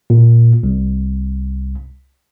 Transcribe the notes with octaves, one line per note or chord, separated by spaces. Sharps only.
A#2
C2